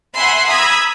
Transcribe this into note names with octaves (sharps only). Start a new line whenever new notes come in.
E5 F#5 G#5 B5 C6
A#5 B5 D#6 E6 G#6 B6